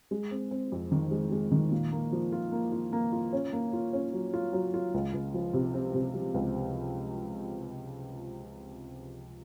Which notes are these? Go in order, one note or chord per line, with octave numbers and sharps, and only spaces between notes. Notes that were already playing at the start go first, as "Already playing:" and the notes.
G#3
C4
C4
F2
D#3
G#3
G#3
D#3
A#2
A#3
F3
F4
A#3
F4
A#3
F4
C#4
A#3
F4
C#4
F#3
F4
F#3
F4
C#2
C#2
F3
C3
C4
C3
F3
C#2